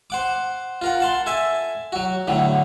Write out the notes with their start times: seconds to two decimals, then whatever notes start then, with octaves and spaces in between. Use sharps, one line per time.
0.10 C5 F#5 D6
0.81 F4 A#4 F#5
1.00 F#5 A5 C6
1.26 A4 E5 G#5 A5
1.92 F#3 F#4
2.27 A2 D3 F#3